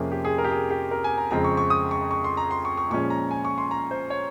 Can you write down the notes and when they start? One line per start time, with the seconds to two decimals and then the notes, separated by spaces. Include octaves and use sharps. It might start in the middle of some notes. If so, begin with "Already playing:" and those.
Already playing: F2 C3 F3 A#3 C#4 G#4
0.12 G4
0.25 G#4
0.38 A#4
0.44 G4
0.51 G#4
0.70 G4
0.91 A#4
1.04 G#5
1.18 A#5
1.31 F2 C#3 G#3 C4 A#5
1.44 C#6
1.57 C#6
1.70 D#6
1.91 C#6
2.11 C#6
2.24 C6
2.37 A#5
2.51 C6
2.65 C#6
2.77 C#6
2.90 A#2 F3 G#3 C#4 C#6
3.10 A#5
3.31 G#5
3.45 C#6
3.58 C6
3.71 A#5
3.91 C5
4.10 C#5